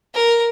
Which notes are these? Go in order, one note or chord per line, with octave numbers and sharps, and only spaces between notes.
A#4